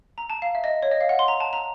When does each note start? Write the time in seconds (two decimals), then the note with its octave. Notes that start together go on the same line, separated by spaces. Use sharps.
0.18 A#5
0.30 A5
0.42 F5
0.55 E5
0.64 D#5
0.82 C#5
0.91 D#5
1.01 F5
1.09 F#5
1.19 C6
1.28 A#5
1.40 A5
1.53 A#5